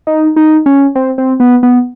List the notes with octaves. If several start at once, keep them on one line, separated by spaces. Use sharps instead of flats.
D#4
D#4
C#4
C4
C4
B3
B3